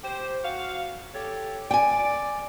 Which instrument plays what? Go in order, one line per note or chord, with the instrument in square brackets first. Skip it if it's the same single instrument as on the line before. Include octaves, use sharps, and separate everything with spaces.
[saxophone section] G4 C5
F#4 F5
G4 A4 C#5
[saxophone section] D5 [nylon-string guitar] G5 G#5